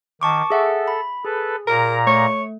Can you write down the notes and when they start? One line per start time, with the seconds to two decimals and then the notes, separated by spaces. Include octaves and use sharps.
0.21 D#3 A5 C#6 D6
0.50 G#4 A4 E5 F#5
0.88 B5
1.25 G#4 A4 B4
1.67 A#2 A#4 A#5
2.07 A3 C#5